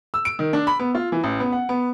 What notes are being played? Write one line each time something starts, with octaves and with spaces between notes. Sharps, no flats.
E6
D7
D#3
D4
B5
B3
F4
E3
A1
B3
F#5
B3